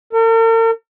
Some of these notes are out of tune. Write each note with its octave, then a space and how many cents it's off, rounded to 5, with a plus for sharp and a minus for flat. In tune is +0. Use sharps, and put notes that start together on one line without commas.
A#4 -45